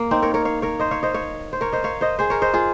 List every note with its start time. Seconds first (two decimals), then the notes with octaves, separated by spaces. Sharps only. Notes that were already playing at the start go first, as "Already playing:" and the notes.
Already playing: A#3
0.11 C4 D#4
0.22 A#4 C#5
0.34 A#4 C#5
0.45 C#5 F5
0.62 A#4 C#5
0.79 C5 D#5
0.91 C#5 F5
1.03 C5 D#5
1.14 C#5 F5
1.53 C5
1.61 A#4 C#5
1.73 C5 D#5
1.84 C#5 F5
2.01 C5 D#5
2.19 G#4 C5
2.30 A#4 C#5
2.42 C5 D#5
2.53 F4 G#4